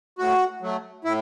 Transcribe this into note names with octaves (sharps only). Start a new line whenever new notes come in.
A2 F#4
F#3 A3
A2 E4